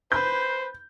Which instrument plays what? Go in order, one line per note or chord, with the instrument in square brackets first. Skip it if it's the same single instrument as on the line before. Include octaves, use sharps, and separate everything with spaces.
[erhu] B4 [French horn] C5 [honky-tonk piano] G6